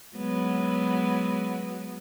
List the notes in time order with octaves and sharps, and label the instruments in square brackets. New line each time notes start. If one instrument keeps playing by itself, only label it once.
[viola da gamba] F#3 G#3 B3